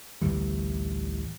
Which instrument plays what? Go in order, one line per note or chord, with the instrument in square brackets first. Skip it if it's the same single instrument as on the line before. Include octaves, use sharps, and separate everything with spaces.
[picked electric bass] A1 D2 E3 G3